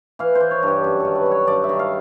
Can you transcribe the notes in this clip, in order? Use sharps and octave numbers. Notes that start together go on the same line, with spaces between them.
E3 F5
C5
E3
C#5
G2 G4
F#2
D#3 A4
B4
F#3
C#5
G2 D5
E5
D#3
F5